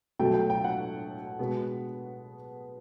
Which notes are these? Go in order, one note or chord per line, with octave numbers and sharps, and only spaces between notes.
B2 F#3 A3 G5
G5
G5
F#5
B2 G#3 B3